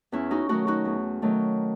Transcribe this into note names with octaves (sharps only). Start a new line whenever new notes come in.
E2 C#4 E4
D#4 F#4
D#3 F#3 A3 D#4 F#4
D#4 F#4
E2
D#3 F#3 A3